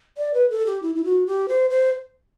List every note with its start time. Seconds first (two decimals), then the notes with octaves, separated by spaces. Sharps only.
0.18 D5
0.34 B4
0.50 A4
0.67 G4
0.82 E4
0.95 E4
1.04 F#4
1.27 G4
1.49 C5
1.70 C5